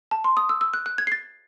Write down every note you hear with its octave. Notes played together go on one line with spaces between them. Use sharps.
A5
C6
D#6
E6
E6
F#6
F#6
G#6
C7
A6